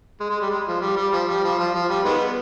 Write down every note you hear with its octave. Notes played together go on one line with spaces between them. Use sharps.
G#3
G#3
G3
G#3
F3
G3
G3
F3
G3
F3
F3
F3
G3
D#3 G#3 B3